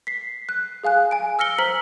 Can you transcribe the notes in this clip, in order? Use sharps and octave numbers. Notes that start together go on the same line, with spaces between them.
B6 C7
F#6
G#4 F5 G#5 F#6
G#5 D7
E6 F6 A#6 C#7 G7
C5 A#5 E6 F6 B6 F#7